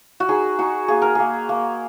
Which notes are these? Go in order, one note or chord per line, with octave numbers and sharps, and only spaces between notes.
F#4
D#4 G#4
D#4 F#4
A#3 G#4
A#4
A#3 G#4
A#3